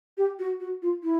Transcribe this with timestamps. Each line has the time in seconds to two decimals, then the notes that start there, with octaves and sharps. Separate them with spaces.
0.17 G4
0.39 F#4
0.60 F#4
0.82 F4
1.03 E4